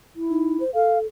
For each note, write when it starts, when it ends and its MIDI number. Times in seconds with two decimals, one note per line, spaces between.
0.16 0.63 64
0.30 0.57 63
0.60 0.70 72
0.74 1.07 69
0.74 0.99 77